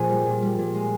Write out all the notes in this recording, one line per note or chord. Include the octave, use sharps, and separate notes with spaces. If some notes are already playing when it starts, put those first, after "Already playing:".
Already playing: A#2 F3 G#4
G3
A#2
G3
A#2
G#3